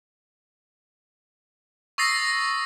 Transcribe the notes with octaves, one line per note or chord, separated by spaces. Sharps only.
C#6 D#6 E6 A6 A#6 C7